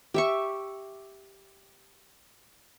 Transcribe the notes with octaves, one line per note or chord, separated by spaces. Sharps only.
G4 E5 C#6